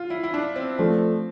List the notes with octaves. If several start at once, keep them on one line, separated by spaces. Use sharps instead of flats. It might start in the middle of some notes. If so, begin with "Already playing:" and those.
Already playing: F4
E4
E4
D4
C4
F3 A3 C4 D4